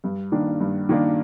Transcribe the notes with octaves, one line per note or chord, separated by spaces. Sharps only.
G2
D#3 A#3 D4
G2
D#3 A#3 D4